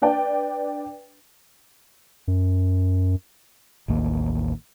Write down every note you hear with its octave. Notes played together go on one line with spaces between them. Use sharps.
D4 B4 D5 G5
F#2
A1 D#2 D#3 A#3